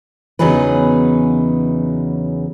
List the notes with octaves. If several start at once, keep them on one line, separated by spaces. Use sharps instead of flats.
E2 C#3 F#3 D#4 G#4 B4